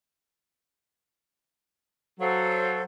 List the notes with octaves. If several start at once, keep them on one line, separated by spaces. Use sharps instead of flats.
F#3 A4 C5 F5